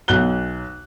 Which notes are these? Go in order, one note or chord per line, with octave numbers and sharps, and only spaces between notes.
B1 F#6 G7